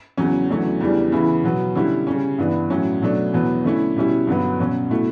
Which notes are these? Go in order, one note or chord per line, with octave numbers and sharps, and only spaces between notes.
E2 C#3 F#3 C#4
E2 D3 F#3 A3 C#4
E2 C#3 E3 G3 D4
C#3 E3 B3 E4
B2 F#3 B3
D3 G3 C#4 E4
C#3 G3 C#4
G2 E3 B3 D4
A2 F#3 C#4
B2 F#3 A3 D4
E2 B2 F#3 B3
D3 A3 C#4 E4
B2 G3 C#4 E4
G2 D3 F#3 B3
B2 F#3 C#4
B2 A3 E4